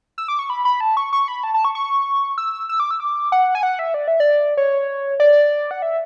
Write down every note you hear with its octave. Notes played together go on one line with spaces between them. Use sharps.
E6
D6
C#6
B5
B5
A5
C#6
C#6
B5
A5
A5
C#6
C#6
E6
E6
D6
E6
D6
F#5
G#5
F#5
E5
D5
E5
D5
C#5
D5
F#5
E5